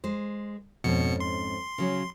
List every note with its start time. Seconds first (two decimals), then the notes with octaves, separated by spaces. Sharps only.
0.04 G#3 C5
0.84 F2 G#2 B2 C#4 C#7
1.20 C6
1.78 C#3 F#3 C#4